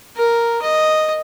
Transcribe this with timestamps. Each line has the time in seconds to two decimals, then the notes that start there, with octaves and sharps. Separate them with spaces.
0.17 A#4
0.62 D#5